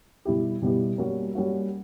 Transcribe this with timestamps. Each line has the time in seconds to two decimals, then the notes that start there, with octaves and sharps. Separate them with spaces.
0.25 B2 G3 B3 E4 G4
0.62 B2 G3 B3 E4 G4
0.98 G3 A#3 C#4 F#4
1.35 G3 A#3 C#4 F#4